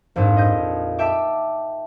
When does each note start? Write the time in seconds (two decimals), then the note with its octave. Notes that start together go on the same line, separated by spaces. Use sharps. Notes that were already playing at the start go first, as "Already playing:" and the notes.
0.16 A#1 F2 G#2
0.37 D#5 D#6 G6
0.98 E5 G5 A5 D6